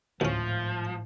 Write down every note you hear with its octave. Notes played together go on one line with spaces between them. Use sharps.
G#1 D2 A2 F3 C#4